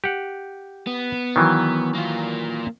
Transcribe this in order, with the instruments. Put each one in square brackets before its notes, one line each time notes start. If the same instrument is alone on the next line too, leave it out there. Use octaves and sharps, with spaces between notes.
[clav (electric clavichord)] G4 F#5
[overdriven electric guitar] B3
[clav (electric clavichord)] D#3 E3 F#3
[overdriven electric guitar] A#3 F4